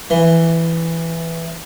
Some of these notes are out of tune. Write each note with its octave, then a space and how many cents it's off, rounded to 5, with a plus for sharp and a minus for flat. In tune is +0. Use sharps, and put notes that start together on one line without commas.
E3 +5